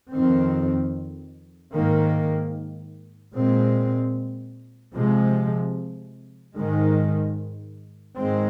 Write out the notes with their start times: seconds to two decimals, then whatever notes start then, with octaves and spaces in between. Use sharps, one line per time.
0.11 F2 D#3 C4
1.73 G#2 D#3 A#3
3.34 A#2 G#3 C4
4.94 C3 F3 G#3
6.55 G#2 D#3 G#3
8.16 G#2 D#3 G#3 C4